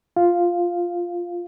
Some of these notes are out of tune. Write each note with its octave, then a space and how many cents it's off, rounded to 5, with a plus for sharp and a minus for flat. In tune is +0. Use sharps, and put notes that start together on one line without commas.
F4 +0 F5 +0